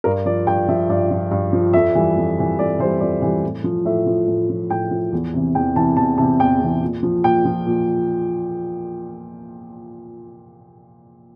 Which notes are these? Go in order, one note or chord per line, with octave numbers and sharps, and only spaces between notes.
G2 A#4
F3 D5
G2 G5
F3 E5
G2 D5
F3
G2
F3
F2 E5
E3 G3
F2
E3 G3
F2 D5
E3 G3 C5
F2 D5
E3 G3
A2
F3
A2 E5
F3
A2
F3
A2 G5
F3
E2
C3 E3
E2 G5
C3 E3 A5
E2 A5
C3 E3 A5
E2 G5
C3 E3
A#2
F3
A#2 G5
F3
A#2